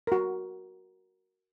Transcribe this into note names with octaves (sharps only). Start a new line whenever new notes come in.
F#4 A#4